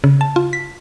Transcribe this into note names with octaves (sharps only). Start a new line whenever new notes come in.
C#3
A5
F4
B6